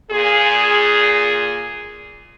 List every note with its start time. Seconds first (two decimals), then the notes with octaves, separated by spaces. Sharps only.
0.12 A#2 G#4